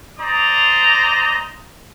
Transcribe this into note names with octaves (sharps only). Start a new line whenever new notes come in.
C5 D5 D#5 A#5